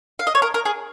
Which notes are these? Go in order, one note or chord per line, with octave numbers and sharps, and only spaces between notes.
F5
D#5
C#5
A#4
A#4
G#4